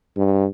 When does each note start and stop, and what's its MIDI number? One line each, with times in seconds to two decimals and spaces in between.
0.17 0.47 43